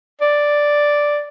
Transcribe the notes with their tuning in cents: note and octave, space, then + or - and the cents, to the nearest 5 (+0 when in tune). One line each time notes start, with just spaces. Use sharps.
D5 +0